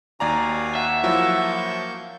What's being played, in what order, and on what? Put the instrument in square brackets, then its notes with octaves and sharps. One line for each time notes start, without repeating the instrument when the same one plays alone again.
[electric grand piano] D#2 D5 A#5 [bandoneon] F#4 F5 G#5
[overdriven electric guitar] E5 [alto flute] F#5
[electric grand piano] F3 F#3 E4 [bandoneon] A#3 C#6 G6